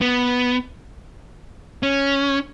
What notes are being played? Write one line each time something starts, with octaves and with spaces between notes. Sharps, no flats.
B3
C#4